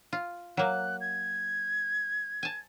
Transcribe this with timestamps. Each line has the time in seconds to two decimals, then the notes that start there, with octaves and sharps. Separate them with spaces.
0.13 F4
0.57 F#3 A#3 F#6
1.01 G#6
2.43 G#5 A5